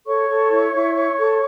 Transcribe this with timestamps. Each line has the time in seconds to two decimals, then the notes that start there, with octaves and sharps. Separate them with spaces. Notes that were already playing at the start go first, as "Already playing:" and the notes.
0.06 A4 C#5 C#6
0.28 A4
0.51 E4
0.74 E4
0.96 C#5
1.18 A4